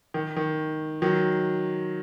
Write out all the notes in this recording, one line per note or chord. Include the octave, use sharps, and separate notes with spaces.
D#3
D#3
D#3 F#3